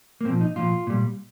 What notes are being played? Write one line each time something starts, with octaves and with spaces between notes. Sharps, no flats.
A#3
A#2 F3 C4
D#4
A#2 F3 F4
A#2 G3